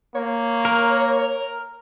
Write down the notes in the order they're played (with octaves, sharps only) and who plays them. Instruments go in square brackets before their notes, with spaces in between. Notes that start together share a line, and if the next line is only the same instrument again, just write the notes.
[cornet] A#3 [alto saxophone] C#5
[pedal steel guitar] A#4